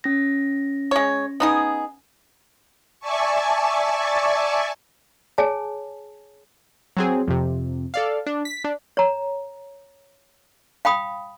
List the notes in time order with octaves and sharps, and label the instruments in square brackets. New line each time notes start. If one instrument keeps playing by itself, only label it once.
[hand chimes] C#4 A#6
[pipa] G#3 C#5
B3 D#4 G#4
[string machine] D5 E5 G#5 A5 C#6
[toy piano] G#4 C#5 G#5 A5
[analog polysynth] F#3 C4 G#4
F2 C3
A4 D5 F5
D4
B6
D4
[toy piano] C#5 A#5
F5 G5 B5 D#6